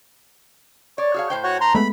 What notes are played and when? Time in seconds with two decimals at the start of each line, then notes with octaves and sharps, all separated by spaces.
0.98 C#5 D5
1.14 F#4 G#4 F5
1.30 A2 C5 G5
1.44 F#4 C#5 F#5
1.61 A#5 C6
1.75 G#3 A3 B3 B5